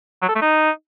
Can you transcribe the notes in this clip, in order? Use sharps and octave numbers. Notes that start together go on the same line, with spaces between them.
F#3
A4
A3
D#4